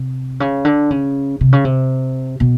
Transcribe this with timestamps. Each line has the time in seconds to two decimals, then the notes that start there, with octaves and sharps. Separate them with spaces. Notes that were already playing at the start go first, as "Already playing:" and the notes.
Already playing: C3
0.40 C#3
0.65 D3
0.91 C#3
1.41 C3
1.53 C#3
1.65 C3
2.40 B2